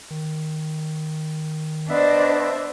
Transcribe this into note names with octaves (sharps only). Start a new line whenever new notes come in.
D#3
B3 D4 C5 D#5 E5